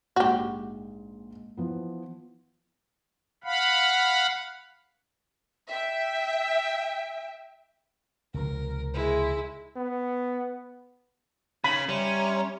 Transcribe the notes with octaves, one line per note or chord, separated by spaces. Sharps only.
A#1 G#2 F#4 G4
E3 F3 B3
F5 F#5 B5
E5 G5
C#2 C3 F3 A#4
G#3 E4
B3
C#3 D#4 B5 G#6
G3 C#4 E5 A#5 C6